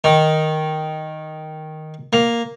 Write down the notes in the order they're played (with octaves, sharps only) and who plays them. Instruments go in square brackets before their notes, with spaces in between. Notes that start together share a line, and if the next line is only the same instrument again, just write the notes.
[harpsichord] D#3
A#3